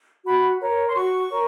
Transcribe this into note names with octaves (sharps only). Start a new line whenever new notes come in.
F#4 B5
A#4 C#5
C6
F#4 C#6
A#4 C#5